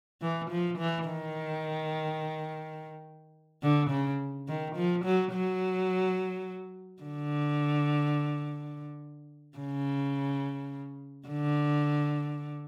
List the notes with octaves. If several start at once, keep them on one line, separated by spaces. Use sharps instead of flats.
E3
F3
E3
D#3
D3
C#3
D#3
F3
F#3
F#3
D3
C#3
D3